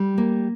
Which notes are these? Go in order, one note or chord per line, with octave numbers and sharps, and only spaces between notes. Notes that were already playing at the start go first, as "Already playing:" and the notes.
Already playing: G3
A#3